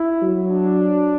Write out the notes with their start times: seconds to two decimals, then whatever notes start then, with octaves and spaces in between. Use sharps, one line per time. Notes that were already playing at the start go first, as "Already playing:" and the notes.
Already playing: E4
0.22 F#3
0.49 D4